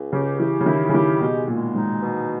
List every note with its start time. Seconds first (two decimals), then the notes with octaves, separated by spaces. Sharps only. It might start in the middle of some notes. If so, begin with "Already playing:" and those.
Already playing: C#2
0.12 C#3 G4
0.40 E3 G4
0.61 C#3
0.66 D#3 E4
0.89 C#3
0.94 D#3 G4
1.20 B2 G#3
1.48 A#2 G#3
1.75 G#2 D#4
2.02 B2